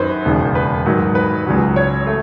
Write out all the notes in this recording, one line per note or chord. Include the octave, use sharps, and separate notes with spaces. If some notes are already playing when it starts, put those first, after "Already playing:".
Already playing: F#2 D#3 F#3 B4 C5
E1 D#2 C#3
B4
G#2 D#3 F#3
B4
C#2 C#3 F#3
C#5
A3